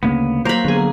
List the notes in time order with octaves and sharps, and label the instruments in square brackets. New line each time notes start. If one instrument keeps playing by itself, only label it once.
[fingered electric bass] D2 C#3 [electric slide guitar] A#3 B3
[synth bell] F#3 [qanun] A#3 B5 [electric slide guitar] C5 A#5
[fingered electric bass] D3 B3 [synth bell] F#3 G#4